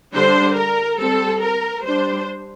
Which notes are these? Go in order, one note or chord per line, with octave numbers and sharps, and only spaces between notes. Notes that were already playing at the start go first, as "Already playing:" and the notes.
D3 G3 D4 C5
A#4
G3 C4 A4
A#4
G3 D4 C5